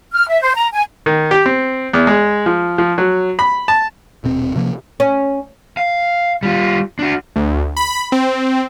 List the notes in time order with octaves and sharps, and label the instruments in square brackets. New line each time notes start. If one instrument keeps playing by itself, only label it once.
[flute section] F6
E5
C5
A#5
G#5
[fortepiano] D#3
G4
C4
E2
G#3
F3
F3
F#3
B5
A5
[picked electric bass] D#1 B2 C4
C3 F3 A#3
[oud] C#4
[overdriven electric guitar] F5
G3 F4
D4 F#4
[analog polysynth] D2
B5
C4